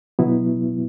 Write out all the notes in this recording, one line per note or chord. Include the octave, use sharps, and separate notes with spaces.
B2 F#3 B3 E4